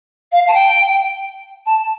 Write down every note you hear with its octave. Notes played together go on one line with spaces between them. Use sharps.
F5
A5
G5
A5